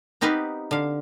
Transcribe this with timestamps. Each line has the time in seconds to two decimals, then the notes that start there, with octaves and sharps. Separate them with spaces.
0.21 B3 C4 D#4 G4 B4 F5
0.71 D3 F5